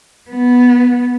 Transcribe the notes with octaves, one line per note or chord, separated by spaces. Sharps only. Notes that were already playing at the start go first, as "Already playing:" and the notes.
B3